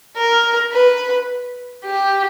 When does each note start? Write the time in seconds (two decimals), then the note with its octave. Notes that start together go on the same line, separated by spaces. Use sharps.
0.17 A#4
0.73 B4
1.85 G4